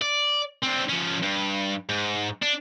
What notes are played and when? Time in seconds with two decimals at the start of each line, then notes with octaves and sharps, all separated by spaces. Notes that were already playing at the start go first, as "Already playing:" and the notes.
0.02 D5
0.63 C4 D4
0.90 F3 C#4
1.23 G2
1.89 G#2
2.43 D4